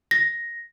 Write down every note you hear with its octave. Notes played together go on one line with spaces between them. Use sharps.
A#6